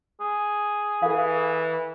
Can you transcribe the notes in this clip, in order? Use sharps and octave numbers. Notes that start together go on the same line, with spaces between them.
G#4
E3 A4 F5